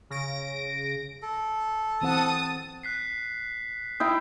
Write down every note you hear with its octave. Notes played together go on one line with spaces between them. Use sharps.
C#3 A#6 D7
A4
E3 C4 F#5 A5 D#6
F#6 B6 C7
D#4 E4 G5